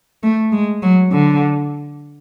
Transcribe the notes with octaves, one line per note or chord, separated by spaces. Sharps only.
A3
G#3
F#3
D3